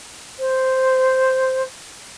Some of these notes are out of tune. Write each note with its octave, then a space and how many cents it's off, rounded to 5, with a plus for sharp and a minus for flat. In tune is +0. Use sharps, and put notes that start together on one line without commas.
C5 -5